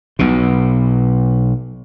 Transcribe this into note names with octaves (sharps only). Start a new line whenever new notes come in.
B1 B2